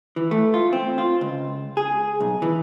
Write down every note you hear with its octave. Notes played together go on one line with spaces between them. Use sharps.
E3
A3
F4
C4
F4
C#2
G#4
B1
E3